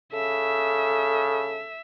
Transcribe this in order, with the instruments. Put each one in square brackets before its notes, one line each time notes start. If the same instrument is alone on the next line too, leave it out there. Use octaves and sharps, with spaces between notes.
[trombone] C#3 [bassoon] A4 [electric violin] E5